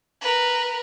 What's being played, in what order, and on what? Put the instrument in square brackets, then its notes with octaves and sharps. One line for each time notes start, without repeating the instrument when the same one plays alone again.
[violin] A#4 B4